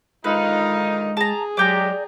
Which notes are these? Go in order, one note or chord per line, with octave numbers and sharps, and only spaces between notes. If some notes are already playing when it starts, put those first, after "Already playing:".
D3 D#3 G#3 D#4 F4 B4 F5
G#4 A5 A#5
F#3 G#3 G4 D5 G5 A#5